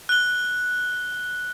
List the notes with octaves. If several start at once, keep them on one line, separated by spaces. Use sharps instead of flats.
F#6 G7